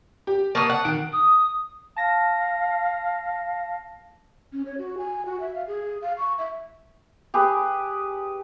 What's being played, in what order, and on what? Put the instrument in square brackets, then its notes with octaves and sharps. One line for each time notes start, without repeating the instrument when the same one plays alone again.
[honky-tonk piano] G4
[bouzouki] A#3 B3 [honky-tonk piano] A5 C#6 D#6
[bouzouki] F#5
[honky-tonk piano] D#3 D7
[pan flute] D#6
[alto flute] F5 [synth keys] A5 A#6
[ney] C#4
C#5
F#4
G#5
F#4
E5
F5
G#4
F5
C#6
E5
[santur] G4 G#4 B4